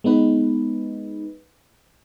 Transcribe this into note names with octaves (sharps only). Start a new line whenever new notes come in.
G#3 B3 D#4 B4